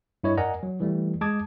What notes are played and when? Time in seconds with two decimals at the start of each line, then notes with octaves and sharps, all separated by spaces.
0.24 G2 E4 C#5 D#5
0.37 A#4 D5 D#5 F#5 G#5 A#5
0.63 F#3
0.80 E3 G3 A3
1.21 G#3 A5 D6 D#6 G#6